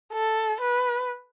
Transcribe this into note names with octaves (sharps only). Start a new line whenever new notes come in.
A4
B4